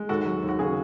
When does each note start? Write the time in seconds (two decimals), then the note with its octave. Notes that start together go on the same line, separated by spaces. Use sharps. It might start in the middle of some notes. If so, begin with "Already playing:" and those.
Already playing: G#3
0.09 D#2 F#4 A4
0.26 F#3
0.43 D#2
0.49 F#4
0.59 C#3 G#4